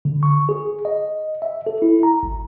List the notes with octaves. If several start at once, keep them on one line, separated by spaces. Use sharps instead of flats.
D3
C#6
G#4
D#5
E5
A4
E4
A#5
G#1